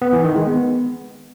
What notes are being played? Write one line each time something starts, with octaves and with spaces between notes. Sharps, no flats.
B3
E3
D#3
G#3
B3